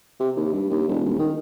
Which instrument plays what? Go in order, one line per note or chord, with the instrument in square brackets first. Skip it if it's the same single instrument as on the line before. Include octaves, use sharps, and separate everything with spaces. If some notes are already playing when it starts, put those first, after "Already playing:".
[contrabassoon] C3
D#2
G2
D#2
E1
D#1
D#3